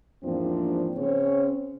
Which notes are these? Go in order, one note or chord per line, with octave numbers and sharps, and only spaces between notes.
E2 G#2 F3 A#3 C4 D4
C#3 C4 C#4 G#4 C#5